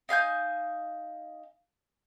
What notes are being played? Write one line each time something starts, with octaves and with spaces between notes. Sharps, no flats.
D#4 F5 G#5 G6